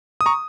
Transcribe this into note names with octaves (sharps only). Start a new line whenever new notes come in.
D#6
A#5 C#6